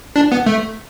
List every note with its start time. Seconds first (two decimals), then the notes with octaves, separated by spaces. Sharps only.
0.16 D4
0.32 B3
0.46 A3